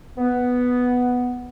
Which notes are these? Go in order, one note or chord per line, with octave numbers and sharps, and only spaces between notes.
B3